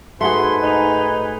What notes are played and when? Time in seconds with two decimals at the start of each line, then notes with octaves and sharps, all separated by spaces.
0.21 G#2 A3 F#4 G#4 B4 G#5 C6
0.62 D#4